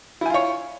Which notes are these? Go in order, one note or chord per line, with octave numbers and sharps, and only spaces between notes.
E4 F4 C#5 G#5